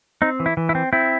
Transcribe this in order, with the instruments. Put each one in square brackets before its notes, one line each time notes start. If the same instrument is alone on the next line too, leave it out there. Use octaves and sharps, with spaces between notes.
[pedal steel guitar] C4 D#4
E3
E4
E3
E4
C4
C4 E4